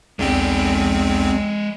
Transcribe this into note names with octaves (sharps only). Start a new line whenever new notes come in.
B1 E2 G#3 C4 D5